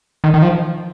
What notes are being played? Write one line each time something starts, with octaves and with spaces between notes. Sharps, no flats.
D#3
D#3
F3